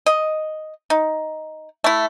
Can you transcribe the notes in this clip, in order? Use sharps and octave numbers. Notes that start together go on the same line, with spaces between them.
D#5
D#4
A3 E4